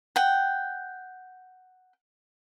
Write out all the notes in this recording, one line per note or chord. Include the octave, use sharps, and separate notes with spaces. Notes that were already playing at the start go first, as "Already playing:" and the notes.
F#5 G5